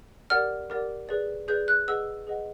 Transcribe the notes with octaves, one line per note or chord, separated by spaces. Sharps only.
G4 A#4 D5 F#5 F6
G4 A#4 D5 F#5
G#4 B4 D5
G#4 B4 D5 G6
F#6
G#4 B4 D#5 F#5 E6
G#4 B4 D#5 F#5